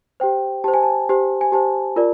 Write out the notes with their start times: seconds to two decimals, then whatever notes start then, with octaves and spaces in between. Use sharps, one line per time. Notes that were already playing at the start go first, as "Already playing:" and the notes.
0.20 G4 C5 G5
0.64 G4 C5 A5
0.74 G#5
0.83 A5
1.09 G4 C5
1.41 G#5
1.52 G4 C5 A5
1.96 F4 A#4 D5